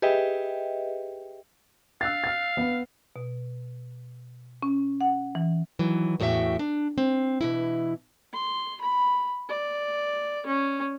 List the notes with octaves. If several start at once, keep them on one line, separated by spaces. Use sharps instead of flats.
G4 G#4 B4 D#5 E5 G5
F5 E6 F#6 A6
F6 A6
B3 B4
B2
C#4
F#5
E3
D#3 E3 F#3
E2 A2 F#4 D#5 E5 G5
D4
C4
B2 E3 E4
C6
B5
D5
C#4